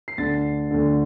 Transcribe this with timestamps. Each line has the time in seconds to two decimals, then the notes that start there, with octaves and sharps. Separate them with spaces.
0.08 C7
0.18 D2 D3 A6
0.71 D2 D3